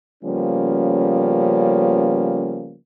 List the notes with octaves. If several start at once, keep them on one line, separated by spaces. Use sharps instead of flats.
C#3 F3 G3 A#3 B3 C#4